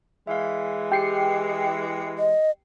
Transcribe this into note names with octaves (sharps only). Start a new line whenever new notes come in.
E3 G#3 E5 F5
G4 G5 C7 C#7
D#5